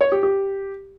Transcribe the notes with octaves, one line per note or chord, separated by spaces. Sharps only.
C#5
G4
G4